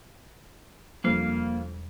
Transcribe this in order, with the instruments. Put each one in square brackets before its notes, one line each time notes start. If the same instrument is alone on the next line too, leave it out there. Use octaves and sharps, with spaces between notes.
[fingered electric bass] E1 G3 D4 [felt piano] F2 [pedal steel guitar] A#3 F5